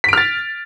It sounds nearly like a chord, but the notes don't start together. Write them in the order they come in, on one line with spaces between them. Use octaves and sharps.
B6 D7 F6 A6